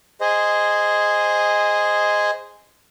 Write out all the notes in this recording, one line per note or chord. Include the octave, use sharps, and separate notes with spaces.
G#4 C5 D#5